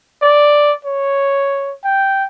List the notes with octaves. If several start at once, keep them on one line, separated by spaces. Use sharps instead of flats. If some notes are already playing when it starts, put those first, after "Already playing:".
D5
C#5
G5